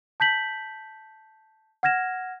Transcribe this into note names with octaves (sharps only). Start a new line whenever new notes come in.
A5 G6 B6 F#7
F#5 F6 G#6 A#6 E7